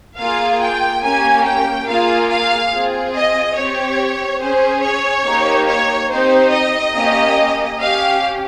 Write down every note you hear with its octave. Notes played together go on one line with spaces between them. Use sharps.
A#3 F4 G#4 F5
G5
A#3 C#4 G4 G#5
G5
A#3 F4 G#4 F5
F5
C4 F4 G#4
D#5
C4 G4 C#5
C#4 G#4 C5
C#5
A#3 D#4 G4
C#5
C4 D#4 G4 C5
D#5
A#3 C#4 G4
C#4 G4 F5